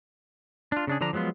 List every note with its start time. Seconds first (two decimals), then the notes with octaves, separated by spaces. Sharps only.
0.72 D4 F4
0.87 C#3 D4 G#4
1.01 D3 F3 D4 A#5
1.13 F3 F#3 G#3 B3 F4